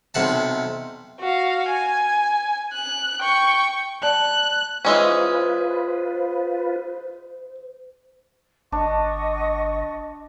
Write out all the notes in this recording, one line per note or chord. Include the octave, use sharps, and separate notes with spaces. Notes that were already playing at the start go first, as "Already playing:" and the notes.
B1 C3 F#5 A5
F#4 F5
G#5
F#6
G5 C#6
D5 A5 F#6
E3 G#3 C#4 F4 B4 C5
G1 D4 D#5 F#5 C#6